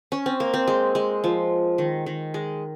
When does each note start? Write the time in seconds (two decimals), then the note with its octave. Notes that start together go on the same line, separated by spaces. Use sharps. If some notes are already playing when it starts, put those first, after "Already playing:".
0.12 C#4
0.26 C4
0.40 A#3
0.54 C4
0.67 G#3
0.95 G#3
1.24 F3
1.78 D#3
2.06 D#3
2.34 G#3